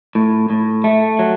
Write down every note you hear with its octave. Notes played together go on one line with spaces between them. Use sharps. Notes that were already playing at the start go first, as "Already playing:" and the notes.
A2
A2
A3
F#3